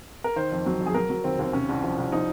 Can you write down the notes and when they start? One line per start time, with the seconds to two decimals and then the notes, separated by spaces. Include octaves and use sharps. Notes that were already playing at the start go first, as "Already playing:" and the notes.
0.24 A#4
0.36 D#3 C5
0.52 F2
0.66 F#3
0.81 F2
0.86 G#4
0.94 F#3 A#4
1.10 F#3
1.24 D#2 C4
1.39 D#2 C4
1.53 C3 C#4
1.69 C2
1.84 F3
1.98 C2
2.12 F3 D#4